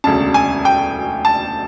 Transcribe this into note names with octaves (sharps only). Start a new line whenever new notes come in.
E1 D2 C#3 A5
G#5
G5
A5